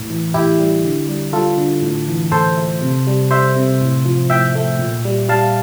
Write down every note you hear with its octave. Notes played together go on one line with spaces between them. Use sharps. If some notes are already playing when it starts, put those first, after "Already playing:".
Already playing: A2
E3
A2 E4 G4
G3
D3
G3
G3 F4 A4
D3
A2
E3
A2 A4 C5
A3
C3
G3
G3 C5 E5
C3
A2
F3
A2 E5 G5
A3
A#2
G3
G3 F5 A5